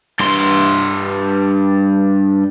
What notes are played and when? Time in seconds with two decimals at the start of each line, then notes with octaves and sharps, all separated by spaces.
0.20 G2 C6